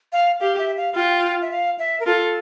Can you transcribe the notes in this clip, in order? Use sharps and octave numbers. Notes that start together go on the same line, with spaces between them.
F5
G4 F5
E5
F5
F4 G5
E5
F5
E5
A#4
F4 A4